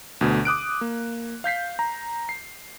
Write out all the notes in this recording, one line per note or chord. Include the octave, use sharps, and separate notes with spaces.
D2 B2
D6 D#6 F#6 D7
A#3
F5 G6 B6 C7
A#5
C7